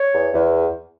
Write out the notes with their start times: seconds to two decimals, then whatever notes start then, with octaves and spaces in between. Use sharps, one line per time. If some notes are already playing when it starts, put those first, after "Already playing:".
Already playing: C#5
0.14 E2
0.33 E2